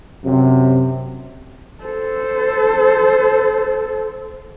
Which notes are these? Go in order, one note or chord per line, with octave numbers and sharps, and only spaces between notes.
F#2 C3
A4 C5